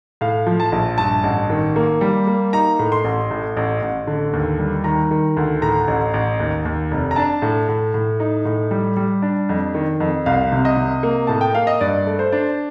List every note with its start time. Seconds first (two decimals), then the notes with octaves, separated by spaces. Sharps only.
0.21 A2 F5
0.46 F3
0.60 A5
0.72 A#1
0.98 G2 A5
1.24 A1
1.50 D#3
1.76 A#3
2.01 G3
2.27 A#3
2.53 D#4 A#5
2.79 A2
2.92 C6
3.04 A1
3.31 A2
3.57 A1
3.82 A1
4.07 D3
4.33 D#2
4.59 G3
4.84 D#3 A#5
5.11 D#3
5.37 D2
5.62 A2 A#5
5.88 A1
6.14 A1
6.40 D#2
6.65 D#2
6.91 F1
7.11 A#5
7.16 D4 A5
7.42 A2
7.68 A2
7.94 A2
8.20 D#4
8.45 A2
8.71 G3
8.96 G3
9.22 D4
9.49 F2
9.74 D#3
10.00 F2
10.26 C2 F5
10.52 C3
10.65 D#5
10.77 C3
11.03 A#3
11.27 A2 A5
11.41 G5
11.55 A#3 F5
11.67 D#5
11.81 G2 D5
12.07 A3
12.19 C5
12.32 D4